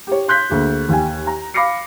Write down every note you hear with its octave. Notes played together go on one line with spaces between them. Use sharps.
G4 C#5
C6 F#6 G6 B6
D2 A#3 G#4
D#2 G5 G#5
A#5
F5 B5 D6 A#6 C7 C#7